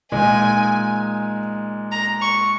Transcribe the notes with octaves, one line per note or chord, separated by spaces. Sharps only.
A#2 G#3 D#4 G#5
A#5
C#6